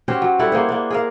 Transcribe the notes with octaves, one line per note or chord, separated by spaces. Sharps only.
C#4 F#4 G4 C5
F#3
G3 E4 A4 F#5
A#3 G#4 C5
A#3 D4
G#4 A#4 F5